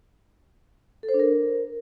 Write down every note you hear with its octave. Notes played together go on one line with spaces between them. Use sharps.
A4
C5
D4
A#4